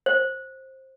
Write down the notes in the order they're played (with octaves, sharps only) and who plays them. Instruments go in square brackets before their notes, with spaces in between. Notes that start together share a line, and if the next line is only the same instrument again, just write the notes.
[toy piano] C5